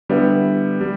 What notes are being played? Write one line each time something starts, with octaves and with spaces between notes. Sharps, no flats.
D3 G3 B3 E4
G3